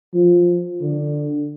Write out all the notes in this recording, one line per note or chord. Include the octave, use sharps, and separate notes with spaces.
F3
D3